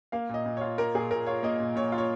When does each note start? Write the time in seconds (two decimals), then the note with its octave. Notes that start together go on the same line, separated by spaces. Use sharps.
0.12 A#3 F5
0.29 A#2 D#5
0.46 A#2
0.57 F4 C#5
0.78 A#3 A#4
0.95 A#2 G#4
1.11 A#2 A#4
1.27 F4 C#5
1.43 A#3 D#5
1.60 A#2
1.75 A#2 C#5
1.92 F4
1.98 C#5